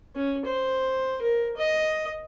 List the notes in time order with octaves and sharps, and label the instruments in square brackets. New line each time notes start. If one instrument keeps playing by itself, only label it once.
[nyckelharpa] C#4
C5
A#4
D#5